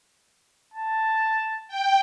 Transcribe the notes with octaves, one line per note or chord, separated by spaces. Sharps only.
A5
G5